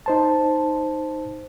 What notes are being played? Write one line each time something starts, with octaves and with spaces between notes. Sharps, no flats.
D#4 C5 A5